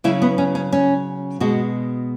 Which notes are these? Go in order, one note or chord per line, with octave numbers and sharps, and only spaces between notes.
C#3 F#3 E4
B3
C#4
C#4
C#4
B2 G#3 F#4